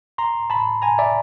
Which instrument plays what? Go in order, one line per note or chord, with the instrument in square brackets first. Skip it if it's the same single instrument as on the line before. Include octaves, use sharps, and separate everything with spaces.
[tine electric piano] A#5 C6
A5 B5
G#5 A#5
D5 E5